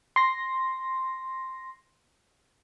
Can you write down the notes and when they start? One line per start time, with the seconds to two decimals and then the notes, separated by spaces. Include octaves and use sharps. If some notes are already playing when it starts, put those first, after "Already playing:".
0.16 C6 A#6